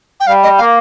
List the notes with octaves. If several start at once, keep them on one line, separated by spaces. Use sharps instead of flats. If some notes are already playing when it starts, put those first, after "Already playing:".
G5
G3 F5
D#5
A#3 F5